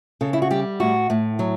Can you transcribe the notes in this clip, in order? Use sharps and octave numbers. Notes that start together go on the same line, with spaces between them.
C#3 A4
E4
F#4
G3 G4
A2 F#4
A2
F#3